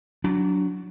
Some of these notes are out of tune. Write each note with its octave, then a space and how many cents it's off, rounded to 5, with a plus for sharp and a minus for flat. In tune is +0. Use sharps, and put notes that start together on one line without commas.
F#3 +0 D4 -25